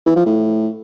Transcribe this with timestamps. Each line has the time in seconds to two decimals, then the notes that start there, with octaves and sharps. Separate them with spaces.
0.06 E3
0.16 F3
0.26 A2